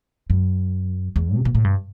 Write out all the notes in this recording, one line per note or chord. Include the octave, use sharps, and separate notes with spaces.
F#2
E2
C3
B2
A2
G2